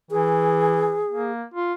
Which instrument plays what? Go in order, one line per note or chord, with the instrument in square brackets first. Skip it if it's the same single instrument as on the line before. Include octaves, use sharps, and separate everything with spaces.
[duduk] E3 [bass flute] G#4
[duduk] A#3
F4